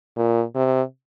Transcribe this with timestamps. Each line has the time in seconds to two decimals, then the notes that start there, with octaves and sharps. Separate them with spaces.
0.16 A#2
0.55 C3